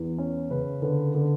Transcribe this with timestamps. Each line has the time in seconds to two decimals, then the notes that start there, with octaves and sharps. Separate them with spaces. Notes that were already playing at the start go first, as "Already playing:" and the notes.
Already playing: E2
0.18 C#4
0.51 C#3 B4
0.82 D3 B4
1.15 D3